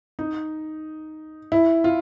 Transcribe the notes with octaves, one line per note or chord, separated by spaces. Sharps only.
D#4
E4
F4